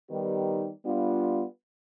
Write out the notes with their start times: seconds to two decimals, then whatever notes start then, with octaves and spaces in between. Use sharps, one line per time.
0.10 D#3 G3 B3 D#4 G4
0.84 G3 B3 D4 F4